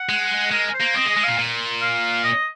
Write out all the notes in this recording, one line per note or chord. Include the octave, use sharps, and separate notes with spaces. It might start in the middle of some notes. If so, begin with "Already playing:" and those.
Already playing: F#5
G#3
G#3 A#4
C5
A#3
C4 D#5
G#3
D#5
G#3
A#2 F5
A#2
F5
D#5